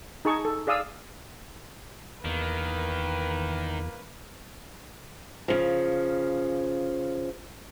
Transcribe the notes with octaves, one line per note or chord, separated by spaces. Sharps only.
D#4 G#4 A5 C#6
A4
G#4 D5 F5 D#6 E6
E2 D#3 A#3 B4
C#3 F3